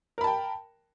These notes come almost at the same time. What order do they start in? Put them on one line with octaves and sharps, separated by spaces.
A#4 B5 A5 G5